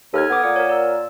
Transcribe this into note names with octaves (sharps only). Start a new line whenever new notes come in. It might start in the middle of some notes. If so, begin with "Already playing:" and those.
D#2 A4 F6 G#6
B3 D6 D#6 G#6
A#2 F#5
A#4 C#5
D5 E6